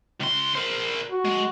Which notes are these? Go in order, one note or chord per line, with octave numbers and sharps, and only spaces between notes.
C#2 C6
A#4 C5
F#4
G#3